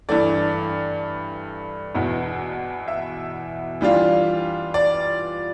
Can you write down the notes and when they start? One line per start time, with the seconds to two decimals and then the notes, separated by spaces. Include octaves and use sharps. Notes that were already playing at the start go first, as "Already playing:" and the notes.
0.09 G2 E3 A3 D5
1.94 E2 B2 B3 E4
2.88 E5
3.81 E3 G3 D4 F4
4.74 D5